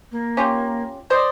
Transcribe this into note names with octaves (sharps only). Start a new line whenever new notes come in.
A#3
C#4 F4 G4
C5 D5 D#5